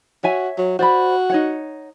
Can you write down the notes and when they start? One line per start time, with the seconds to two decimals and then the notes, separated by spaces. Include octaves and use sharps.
0.23 F#4 C#5 E5 G#5
0.58 F#3
0.79 F#4 C5 D5 B5
1.30 D#4 C#5 F#5